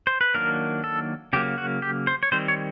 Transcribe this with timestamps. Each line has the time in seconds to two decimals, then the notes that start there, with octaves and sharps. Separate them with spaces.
0.07 C5
0.21 B4
0.34 D#3 F#3 A#3 D4 A#4
0.84 A4
1.33 C#3 F#3 A#3 G4
1.58 F#4
1.82 G4
2.07 C5
2.23 C#5
2.32 D#3 G3 C4 C5
2.48 C#5